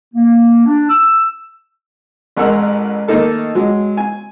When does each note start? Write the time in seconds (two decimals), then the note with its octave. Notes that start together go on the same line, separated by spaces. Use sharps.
0.14 A#3
0.66 D4
0.89 E6
2.36 A1 G#3 A#4 F#5 E6
3.08 D#3 A3 A#3 D#4 A4 A#4
3.55 F#3 G#3
3.97 G#5